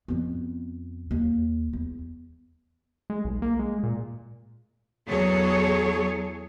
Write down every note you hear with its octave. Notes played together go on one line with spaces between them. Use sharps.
F2 B3
D#2
E2
G#3
B1
A#3
G#3
A#2
E2 F#3 G#4 A4 C#5